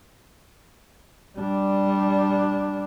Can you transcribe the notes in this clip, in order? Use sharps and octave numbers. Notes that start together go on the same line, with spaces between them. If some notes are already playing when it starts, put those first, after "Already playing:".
G3 D4